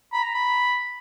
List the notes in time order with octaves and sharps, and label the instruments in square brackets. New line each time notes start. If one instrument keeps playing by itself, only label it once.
[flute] A#5 [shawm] B5
[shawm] A#5
B5